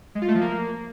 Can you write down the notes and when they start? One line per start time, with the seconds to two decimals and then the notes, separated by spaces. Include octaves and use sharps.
0.15 G#3
0.22 F4
0.28 A3
0.35 F3
0.41 A#3